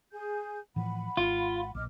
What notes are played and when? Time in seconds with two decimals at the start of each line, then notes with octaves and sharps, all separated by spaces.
0.13 G#4 G#5 G6
0.76 A2 E3 F3 F#5 B5
1.17 G#1 F4
1.75 A#1 D#5 D6 F6